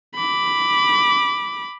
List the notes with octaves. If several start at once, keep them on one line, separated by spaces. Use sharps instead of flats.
B5 D6